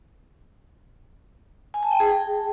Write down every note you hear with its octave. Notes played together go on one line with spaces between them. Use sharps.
G#5
A5
G5
G#4